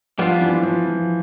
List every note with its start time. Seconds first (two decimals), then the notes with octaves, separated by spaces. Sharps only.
0.18 F3 G3 B3 D4 F4
0.41 E3
0.63 F3
0.85 F3